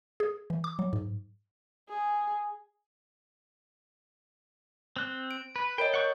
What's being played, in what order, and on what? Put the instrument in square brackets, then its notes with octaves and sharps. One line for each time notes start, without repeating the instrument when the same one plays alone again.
[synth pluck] G#4
E3
D6
F#3
G#2
[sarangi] G#4
[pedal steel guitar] C4 F#6
[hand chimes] D7
[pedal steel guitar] B4
[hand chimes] A#4 C#5 D#5 [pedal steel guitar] G5
[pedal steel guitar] F#5 C#6 G6